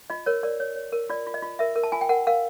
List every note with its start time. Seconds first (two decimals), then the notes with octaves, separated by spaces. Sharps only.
0.10 F4 D#5
0.26 A#4 C#5
0.43 A#4 D5
0.60 C#5
0.76 C#5
0.92 A#4
1.10 F4 D5
1.27 F4
1.34 D#5
1.42 F4
1.59 A#4 E5
1.76 A#4
1.83 A5
1.92 F4 G#5
2.01 G5
2.09 A#4 F#5
2.27 A#4 F5